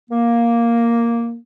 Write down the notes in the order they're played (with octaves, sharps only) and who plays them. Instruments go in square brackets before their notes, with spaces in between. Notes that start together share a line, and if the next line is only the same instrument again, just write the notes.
[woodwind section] A#3